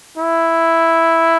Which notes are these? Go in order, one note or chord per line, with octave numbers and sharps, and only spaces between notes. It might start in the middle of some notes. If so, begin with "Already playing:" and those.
E4